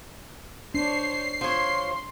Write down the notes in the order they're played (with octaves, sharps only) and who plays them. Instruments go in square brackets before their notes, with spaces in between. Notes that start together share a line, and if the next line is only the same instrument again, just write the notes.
[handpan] D4 [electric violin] C5 C#5 [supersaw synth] C7
[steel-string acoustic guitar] F3 C#5 [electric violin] C6